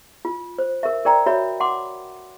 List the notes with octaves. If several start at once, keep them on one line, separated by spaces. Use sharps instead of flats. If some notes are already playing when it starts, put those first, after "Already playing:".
F4
C5
A#4 E5
A#4 D5 G5 A#5
F#4 C#5 E5 B5
F#5 C6 D6